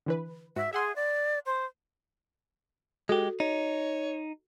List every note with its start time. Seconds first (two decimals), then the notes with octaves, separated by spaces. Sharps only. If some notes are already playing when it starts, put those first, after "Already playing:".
0.06 D3 E3 B4
0.56 G#2 F#4 E5
0.73 G#4 E5 F#5 C6
0.96 D5
1.46 C5
3.09 G#3 F#4 G4 A4
3.40 D#4 C#5